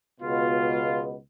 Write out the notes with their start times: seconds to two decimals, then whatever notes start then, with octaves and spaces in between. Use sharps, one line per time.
0.20 C#2 B2 F4